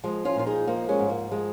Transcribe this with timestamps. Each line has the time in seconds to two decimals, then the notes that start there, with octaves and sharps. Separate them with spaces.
0.04 F3 G#3
0.25 C#4 F4
0.36 A#2 F4
0.46 D#4 G#4
0.67 F3 A#3 D#4
0.88 G#3 C#4
0.99 G#2
1.10 A#3
1.31 F3 G#3